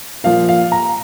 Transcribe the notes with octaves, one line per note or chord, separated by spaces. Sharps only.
A#2 F3 F5
F5
A#5